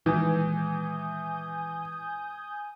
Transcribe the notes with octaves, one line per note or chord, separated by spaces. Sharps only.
A#2 D#3 E3 G#3 G#5 D#6 G6